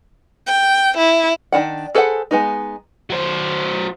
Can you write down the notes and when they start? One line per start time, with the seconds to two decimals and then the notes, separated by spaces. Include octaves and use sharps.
0.47 G5
0.97 E4
1.52 D#3 F#3 D4 F#5
1.95 G#4 A4 B4 C5 F#5
2.31 G#3 B3 D#4
3.10 F#3 C5